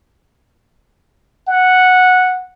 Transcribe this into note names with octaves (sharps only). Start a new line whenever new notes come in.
F#5